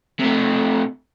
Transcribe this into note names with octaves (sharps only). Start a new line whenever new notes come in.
C3 A3